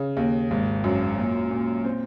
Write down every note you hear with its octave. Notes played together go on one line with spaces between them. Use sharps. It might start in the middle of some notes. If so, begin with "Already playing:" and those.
Already playing: C#3
D#2
G#1
F#2
A#2
A#2
C4